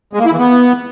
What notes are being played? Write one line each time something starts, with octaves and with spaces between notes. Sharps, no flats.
G#3
A#3
E4
E3
B3